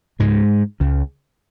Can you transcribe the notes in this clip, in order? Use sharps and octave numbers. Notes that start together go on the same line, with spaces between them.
C#2 G#2 C#3 G#3
C#2 C#3